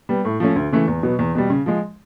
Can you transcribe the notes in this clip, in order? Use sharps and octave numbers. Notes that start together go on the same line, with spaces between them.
G3 B3
A2
F3 A3 C#4
D2
C#3 E3 A3
E2
B2 F#3 B3
E2
B2 G3
C#3
F3 G#3